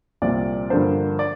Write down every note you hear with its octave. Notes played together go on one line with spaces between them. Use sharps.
C2 A#2 F3 C4 D5
G2 D3 F3 A#3 D4 C5
D5